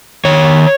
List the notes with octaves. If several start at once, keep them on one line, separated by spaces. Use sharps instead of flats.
D#3 C#5